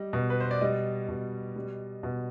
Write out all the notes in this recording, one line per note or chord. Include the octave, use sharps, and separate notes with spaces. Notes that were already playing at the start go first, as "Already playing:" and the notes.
Already playing: G3 D#5
B2
B4
C5
D5
G3 D#5
B2
G3
B2